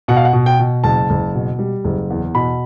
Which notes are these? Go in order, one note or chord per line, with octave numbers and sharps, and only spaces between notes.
B2 F#5
F5
F#5
B2
G5
B2
F#1 A5
F#1
B2
G3
F#1
E2
B2 B5